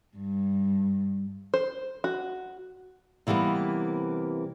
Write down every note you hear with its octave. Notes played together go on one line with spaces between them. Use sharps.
G2
C5
F#4
C3 E3 G3 A#3 B3